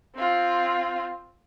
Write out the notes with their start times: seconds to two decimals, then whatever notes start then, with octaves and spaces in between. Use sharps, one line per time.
0.16 C4 F4